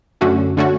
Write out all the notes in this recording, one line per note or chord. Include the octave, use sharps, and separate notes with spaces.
F#2 D3 A3 C#4 F#4
D3 A3 C#4 F#4